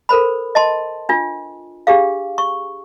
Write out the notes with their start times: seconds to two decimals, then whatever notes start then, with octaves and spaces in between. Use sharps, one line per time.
0.09 A4 A#4 C5 B5
0.55 D#5 A5 C6
1.09 D4 F4
1.87 D4 G4 G#4 F5
2.38 C#6